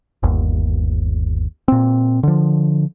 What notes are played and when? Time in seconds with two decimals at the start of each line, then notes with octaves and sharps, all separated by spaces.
0.23 G1 D#2
1.68 A#2 C4
2.23 D3 F3